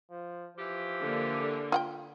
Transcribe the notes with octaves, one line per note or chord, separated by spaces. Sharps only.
F3
E3 F3 G4
D3 A#3
F4 F#5 G5